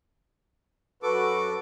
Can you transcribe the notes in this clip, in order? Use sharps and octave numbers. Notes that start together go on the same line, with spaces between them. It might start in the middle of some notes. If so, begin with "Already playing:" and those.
F#2 F#4 A4 B4 D6